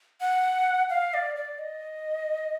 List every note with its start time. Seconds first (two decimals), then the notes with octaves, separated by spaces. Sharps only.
0.21 F#5
0.90 F5
1.14 D5
1.36 D5
1.58 D#5